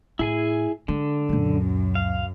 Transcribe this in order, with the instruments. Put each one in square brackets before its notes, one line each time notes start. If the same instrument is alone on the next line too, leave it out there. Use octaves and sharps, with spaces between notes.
[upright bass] A2 [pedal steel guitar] E4 G#4 G#5
[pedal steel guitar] D3 [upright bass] G#3
[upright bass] C#2 A#2 [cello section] F#2
[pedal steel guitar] F5